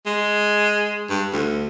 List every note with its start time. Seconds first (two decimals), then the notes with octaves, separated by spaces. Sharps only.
0.06 G#3
1.10 G2
1.33 D2